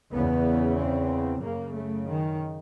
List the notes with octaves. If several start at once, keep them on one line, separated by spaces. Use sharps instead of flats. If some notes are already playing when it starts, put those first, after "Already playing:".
E2 C#3 B3
C4
F#2 C#3 A#3
A3
D#3